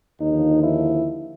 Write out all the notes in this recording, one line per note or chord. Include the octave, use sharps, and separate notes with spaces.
D#2 D3 F3 D#4
E4